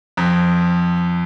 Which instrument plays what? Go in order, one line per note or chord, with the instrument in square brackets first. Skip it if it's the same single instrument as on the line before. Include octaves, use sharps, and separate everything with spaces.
[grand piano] F2